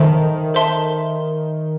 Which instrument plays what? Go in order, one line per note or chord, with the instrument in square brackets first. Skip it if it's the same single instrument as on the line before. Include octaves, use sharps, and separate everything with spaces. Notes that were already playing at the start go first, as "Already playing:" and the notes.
Already playing: [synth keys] D#3 [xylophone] A4 C5 E5 A5 C6
[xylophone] A4 C5 E5 A5 C6